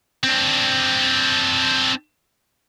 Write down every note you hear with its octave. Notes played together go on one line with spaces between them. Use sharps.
C4 D4